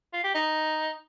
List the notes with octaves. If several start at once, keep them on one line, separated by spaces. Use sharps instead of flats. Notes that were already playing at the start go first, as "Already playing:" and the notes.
F4
G4
D#4